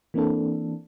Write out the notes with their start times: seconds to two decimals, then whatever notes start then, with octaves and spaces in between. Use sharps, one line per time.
0.14 E3 A#3 C4 D4 A4